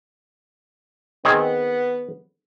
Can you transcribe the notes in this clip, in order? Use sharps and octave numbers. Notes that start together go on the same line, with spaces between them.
D#3 B3 C4 G#4